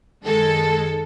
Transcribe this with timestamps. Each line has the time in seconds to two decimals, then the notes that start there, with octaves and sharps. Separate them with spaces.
0.24 F#2 D#3 G#3 A4